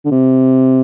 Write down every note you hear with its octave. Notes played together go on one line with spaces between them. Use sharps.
D3
C3